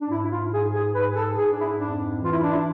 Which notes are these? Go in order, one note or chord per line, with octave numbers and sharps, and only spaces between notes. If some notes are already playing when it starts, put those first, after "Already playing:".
D4
G#2 E4
E4
F4
G#2 G#4
G#4
G#2 B4
G#4
A4
G#2 G#4
D4
E4
F2 D4
E3 F4
E4
D4
E4